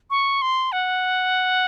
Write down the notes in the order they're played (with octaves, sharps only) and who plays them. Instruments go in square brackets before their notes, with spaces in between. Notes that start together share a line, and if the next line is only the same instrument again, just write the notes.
[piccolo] C#6
C6
F#5